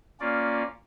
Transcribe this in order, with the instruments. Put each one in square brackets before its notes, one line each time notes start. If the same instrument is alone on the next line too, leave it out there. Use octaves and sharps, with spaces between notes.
[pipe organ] A#3 C#4 F4 D5